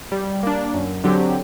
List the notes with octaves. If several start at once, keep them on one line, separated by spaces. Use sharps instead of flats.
G3
A#3 D4
F#2
D3 F#3 C4 G4